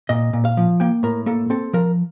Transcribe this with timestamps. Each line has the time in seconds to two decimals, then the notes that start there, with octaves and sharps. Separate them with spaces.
0.09 A#2 D#5
0.33 A#2
0.45 F5
0.57 F3
0.80 A#3 G5
1.03 A2 A#4
1.26 A#3 A4
1.50 C4 A4
1.73 F3 A#4